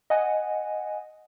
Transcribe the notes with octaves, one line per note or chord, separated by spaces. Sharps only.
D#5 F#5 G#5